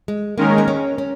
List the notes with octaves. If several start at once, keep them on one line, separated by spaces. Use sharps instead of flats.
G#3
D#3 G#3 A#3 C#4 A#4
A#3
C#4
C#4